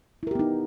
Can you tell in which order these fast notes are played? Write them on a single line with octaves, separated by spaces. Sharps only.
E4 A#4 G4 B3 D#4